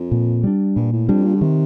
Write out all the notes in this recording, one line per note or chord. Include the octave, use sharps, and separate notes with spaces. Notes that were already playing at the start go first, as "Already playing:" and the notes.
Already playing: F2
A#2
G3 D4
G2 A#2
A2
F2 G3 D4
A#2
D3
C3 D#3